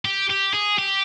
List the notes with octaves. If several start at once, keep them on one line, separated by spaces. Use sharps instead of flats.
G4
G4
G#4
G4